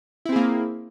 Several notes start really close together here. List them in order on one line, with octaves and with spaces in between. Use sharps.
E4 C4 G#4 A#3